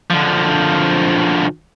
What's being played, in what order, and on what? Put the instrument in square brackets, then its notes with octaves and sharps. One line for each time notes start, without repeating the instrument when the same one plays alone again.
[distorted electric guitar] D3 F3